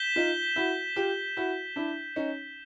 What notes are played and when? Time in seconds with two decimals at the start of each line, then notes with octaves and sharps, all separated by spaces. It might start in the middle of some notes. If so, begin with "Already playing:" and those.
Already playing: G6 B6 E7 G7
0.16 D#4 F4
0.56 E4 F#4
0.96 F4 G4
1.37 E4 F#4
1.76 D4 E4
2.16 C#4 D#4